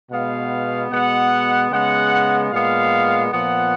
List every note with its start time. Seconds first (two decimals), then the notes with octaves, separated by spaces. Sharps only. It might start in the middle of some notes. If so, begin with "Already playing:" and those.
0.11 B2 G#3 B3 F5
0.91 B2 G#3 B3 F#5
1.71 C#3 G#3 B3 F#5
2.52 A#2 G#3 B3 F5
3.32 A#2 F3 B3 F#5